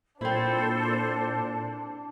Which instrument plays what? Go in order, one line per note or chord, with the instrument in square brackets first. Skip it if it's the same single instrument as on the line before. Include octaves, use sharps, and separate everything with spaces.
[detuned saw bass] A#2 [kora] C4 E4 [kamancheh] D4 [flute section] A4 C5